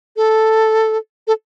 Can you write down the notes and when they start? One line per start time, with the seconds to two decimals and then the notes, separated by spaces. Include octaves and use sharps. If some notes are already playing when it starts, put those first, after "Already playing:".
0.17 A4
1.27 A4